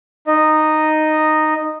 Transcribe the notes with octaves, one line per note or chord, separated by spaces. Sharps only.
D#4 D#5